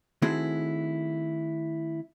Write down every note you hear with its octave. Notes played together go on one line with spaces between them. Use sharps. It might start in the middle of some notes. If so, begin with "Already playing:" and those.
D#3 A3 C4 E4 F#4 G#4